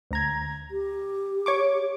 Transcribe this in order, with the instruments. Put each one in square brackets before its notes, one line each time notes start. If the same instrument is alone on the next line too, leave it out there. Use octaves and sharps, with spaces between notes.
[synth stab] D2 A#5 G#6
[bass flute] G4
[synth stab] C#5 C#6 D6